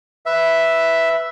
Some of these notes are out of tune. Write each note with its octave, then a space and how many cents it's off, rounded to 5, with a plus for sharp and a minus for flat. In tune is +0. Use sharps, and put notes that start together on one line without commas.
B4 +0 E5 +0